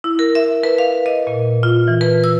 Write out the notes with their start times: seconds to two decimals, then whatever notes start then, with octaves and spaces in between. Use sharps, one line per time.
0.04 E4
0.19 A#4
0.35 E5
0.63 B4
0.78 F5
1.06 D#5
1.27 A#2
1.63 F4
1.88 E3
2.01 B4
2.24 E6